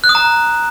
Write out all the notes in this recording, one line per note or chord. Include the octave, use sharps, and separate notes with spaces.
F#6
D#6
A#5